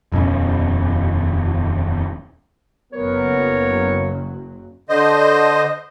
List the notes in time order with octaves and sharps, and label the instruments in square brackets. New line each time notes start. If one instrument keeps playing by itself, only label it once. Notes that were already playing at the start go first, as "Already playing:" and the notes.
[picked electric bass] D#1 F2 B2 C#4
[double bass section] F#1 F#3 [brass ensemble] B3 A#4 [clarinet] C#5
[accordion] D3 C5 D#5